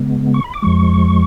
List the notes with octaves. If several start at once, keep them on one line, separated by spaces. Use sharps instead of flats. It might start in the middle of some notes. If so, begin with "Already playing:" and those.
Already playing: C#3 G#3 B3
C#6
B5
D6
F2 F3 G#3 C#6